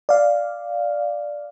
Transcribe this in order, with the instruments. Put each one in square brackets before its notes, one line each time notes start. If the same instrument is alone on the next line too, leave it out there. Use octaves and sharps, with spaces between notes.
[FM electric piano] D5 F5